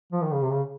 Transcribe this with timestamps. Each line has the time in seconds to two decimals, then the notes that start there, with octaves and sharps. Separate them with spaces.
0.13 F3
0.23 D#3
0.33 C#3
0.43 C3
0.53 C#3